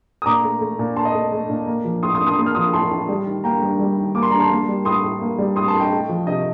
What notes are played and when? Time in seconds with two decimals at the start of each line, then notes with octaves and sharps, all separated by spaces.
0.22 D#6
0.26 A#2 A#5 D6
0.44 A3
0.61 A3
0.79 A#2
0.96 A#2 A5 C6
1.05 D#5
1.14 A3
1.32 A3
1.50 A#2
1.67 A#3
1.85 F3
2.03 A2 C6 D#6
2.14 C6 D#6
2.20 A2
2.26 C6 D#6
2.38 A#3 D#6
2.46 F6
2.55 F3 C6 D#6
2.73 A2 A5 C6
2.91 A2
3.09 G3
3.26 D#3
3.44 A#3 G5 A#5
3.62 G2
3.79 G3
3.97 D#3
4.15 A#3 D6
4.23 C6
4.31 G2 A#5
4.39 A5 C6
4.50 A#3
4.68 G3
4.85 A2 C6 D#6
5.04 A2
5.21 A#3
5.38 G3
5.56 A2 C6 D#6
5.68 A5 C6
5.74 A2
5.80 D#5 G5
5.92 A3
6.09 F3
6.27 C3 D#5